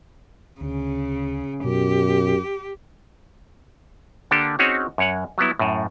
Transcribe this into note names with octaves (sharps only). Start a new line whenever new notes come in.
D2 C#3
F#2 B2 G4
D3 A#3 D4 G4 A4
C4 C#4 D#4 F#4 G#4 C#5
F#2 C#5 F#5
F#3 G3 B3 E4
F#2 A2